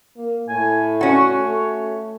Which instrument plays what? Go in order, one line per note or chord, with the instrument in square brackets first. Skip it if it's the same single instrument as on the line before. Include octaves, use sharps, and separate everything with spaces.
[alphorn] A#3
[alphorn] A2 [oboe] G#5
[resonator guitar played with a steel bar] C#4 F#4 [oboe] C#5
[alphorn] A3